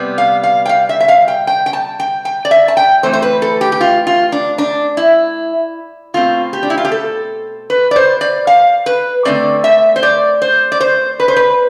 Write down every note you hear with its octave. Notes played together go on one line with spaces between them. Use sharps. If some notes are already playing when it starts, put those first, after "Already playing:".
Already playing: C3 G3 B3
F5
F5
G5
F5
E5
E5
F5
G5
G5
G5
A5
G5
G5
D5
E5
A5
G5
E3 A3 C4 C5
C5
B4
A4
G4
G4
F4
F4
D4
D4
E4
B2 A3 C4 F4
G4
D4
E4
F4
G4
A4
B4
D5
C5
D5
F5
B4
D3 A3 C4 D5
E5
C5
D5
C5
D5
C5
B4
C5
B4